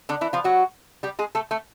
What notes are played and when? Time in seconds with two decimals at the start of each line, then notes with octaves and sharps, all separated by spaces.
0.09 D3 D4
0.21 E3 E4
0.33 F3 F4
0.44 F#3 F#4
1.03 G3 G4
1.19 G#3 G#4
1.35 A3 A4
1.51 A3 A4